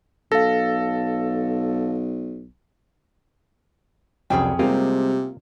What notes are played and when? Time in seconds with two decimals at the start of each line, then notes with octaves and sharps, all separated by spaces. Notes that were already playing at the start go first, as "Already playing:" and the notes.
0.32 B1 A4 F5 A#6
4.30 C2 F2 F#3 G3 C#4 G#4 G5
4.59 C3 G3 G#3 A#3 C4 F4 A#4